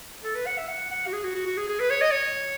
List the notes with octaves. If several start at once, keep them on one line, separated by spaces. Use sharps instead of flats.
A4
B4
F#5
E5
F#5
F#5
F#4
G#4
F#4
F#4
F#4
G#4
G#4
B4
C#5
D#5
C#5